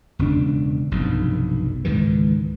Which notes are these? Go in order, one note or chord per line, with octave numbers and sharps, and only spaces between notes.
E1 C#3 D4
F1 B1 G2
C#2 G#2 D#3 E3